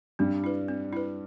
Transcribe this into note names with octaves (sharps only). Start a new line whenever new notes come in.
G2 G3 C4
E4 B4
C4
E4 B4